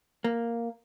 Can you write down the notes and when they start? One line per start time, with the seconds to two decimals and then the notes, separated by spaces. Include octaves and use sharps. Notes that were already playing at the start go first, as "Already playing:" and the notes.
0.24 A#3